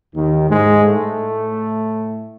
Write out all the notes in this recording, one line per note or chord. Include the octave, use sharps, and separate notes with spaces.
D#2 D#3
G#2 G#3
A2 A3